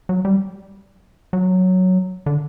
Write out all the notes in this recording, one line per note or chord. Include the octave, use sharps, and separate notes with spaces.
F#3
G3
F#3
D3